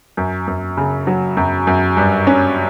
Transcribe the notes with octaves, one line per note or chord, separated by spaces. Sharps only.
F#2
F#2
C#3
F#3
F#2
F#2
G2
C#4